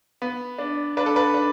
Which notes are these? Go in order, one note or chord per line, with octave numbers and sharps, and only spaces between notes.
B3
D4
D4 B4
A4
B4
D4